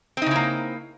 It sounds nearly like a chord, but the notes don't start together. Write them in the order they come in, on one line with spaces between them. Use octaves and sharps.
C4 D#4 C#3 E4 A#3